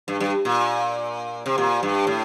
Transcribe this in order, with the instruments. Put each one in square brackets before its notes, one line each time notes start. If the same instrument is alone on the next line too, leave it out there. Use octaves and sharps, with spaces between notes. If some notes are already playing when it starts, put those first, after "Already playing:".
[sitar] G2
G2
A#2
C3
A#2
G2
A2